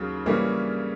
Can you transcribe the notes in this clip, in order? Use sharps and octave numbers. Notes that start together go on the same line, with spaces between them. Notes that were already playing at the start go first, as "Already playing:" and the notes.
Already playing: D#2 C#3 F#3
C#3 E3 G3 A#3 C#4